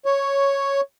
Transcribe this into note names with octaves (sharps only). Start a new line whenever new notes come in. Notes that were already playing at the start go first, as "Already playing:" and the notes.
C#5